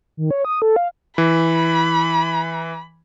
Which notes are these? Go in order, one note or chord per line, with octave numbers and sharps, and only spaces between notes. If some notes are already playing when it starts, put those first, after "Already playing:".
D#3
C#5
D#6
A4
F5
E3 B5